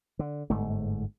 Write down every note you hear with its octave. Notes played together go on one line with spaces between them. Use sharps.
D3
G1 G#2 A3